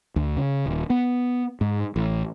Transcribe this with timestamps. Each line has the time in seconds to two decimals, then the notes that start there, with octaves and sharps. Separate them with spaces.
0.16 D2
0.37 C#3
0.66 D#1
0.90 B3
1.61 G#2
1.96 A1